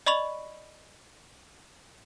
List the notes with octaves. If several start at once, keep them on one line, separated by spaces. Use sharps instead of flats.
D5 D#5 B5 C#6 F7 F#7